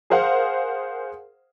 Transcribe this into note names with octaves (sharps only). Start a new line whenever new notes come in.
G#4 A#4 C5 F5 F#5